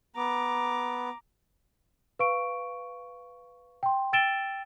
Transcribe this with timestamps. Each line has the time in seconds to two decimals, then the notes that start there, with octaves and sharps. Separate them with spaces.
0.16 B3 A#5 D6
2.19 B4 F5 C#6 D7
3.83 G5 C6
4.13 G5 E6 A6 D7 E7 G7